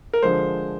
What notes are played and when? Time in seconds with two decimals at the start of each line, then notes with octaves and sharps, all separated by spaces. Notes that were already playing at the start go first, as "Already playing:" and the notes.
0.13 A#4
0.22 D3 F3 G#3 C5